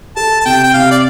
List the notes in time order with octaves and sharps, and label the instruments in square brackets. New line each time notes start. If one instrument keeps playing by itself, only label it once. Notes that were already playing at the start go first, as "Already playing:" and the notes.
[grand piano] A4 [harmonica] A5
[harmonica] A5
[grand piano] C3 [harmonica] G5
[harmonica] G5
[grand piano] C3 [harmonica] F5
[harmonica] D5